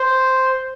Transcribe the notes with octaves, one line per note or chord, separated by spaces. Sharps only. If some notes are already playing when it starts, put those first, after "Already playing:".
Already playing: C5